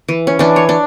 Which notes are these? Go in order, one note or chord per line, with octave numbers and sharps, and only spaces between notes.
E3
C#4
E3 D4
C#5
D4